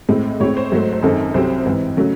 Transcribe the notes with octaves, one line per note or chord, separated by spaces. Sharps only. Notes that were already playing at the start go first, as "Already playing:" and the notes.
A2 G#3 C4
A2 G#3 C4 C#5
C5
G#2 F#3 A3
C5
F#2 D#3 G#3 C4 A4
C2 C3 F#3 C4 C5
G#2 E3 C4
C#3 F#3 A3